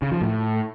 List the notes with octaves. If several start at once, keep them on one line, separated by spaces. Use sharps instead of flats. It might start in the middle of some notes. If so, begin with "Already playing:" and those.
C#3
F3
A2